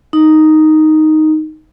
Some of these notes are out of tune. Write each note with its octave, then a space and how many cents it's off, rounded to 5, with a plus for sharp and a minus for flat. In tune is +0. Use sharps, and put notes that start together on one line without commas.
D#4 +0